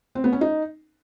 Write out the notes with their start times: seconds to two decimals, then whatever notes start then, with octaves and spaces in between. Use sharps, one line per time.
0.15 C4
0.24 B3
0.33 C#4
0.41 D#4